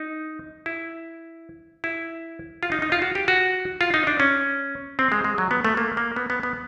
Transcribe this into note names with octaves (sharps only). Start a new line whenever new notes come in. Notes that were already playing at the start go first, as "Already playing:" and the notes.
Already playing: D#4
E4
E4
F4
D#4
D#4
F4
F#4
G4
F#4
F4
D#4
D4
C#4
C4
G#3
G#3
F#3
B3
A3
A#3
A#3
B3
B3
B3